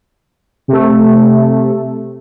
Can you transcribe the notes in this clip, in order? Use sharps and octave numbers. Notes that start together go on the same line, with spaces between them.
C3 A3